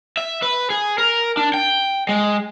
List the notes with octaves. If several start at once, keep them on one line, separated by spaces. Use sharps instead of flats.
E5
B4
G#4
A#4
D4
G5
G#3